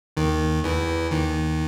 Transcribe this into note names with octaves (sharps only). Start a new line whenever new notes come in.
D#2 D#3
E2 E3
D#2 D#3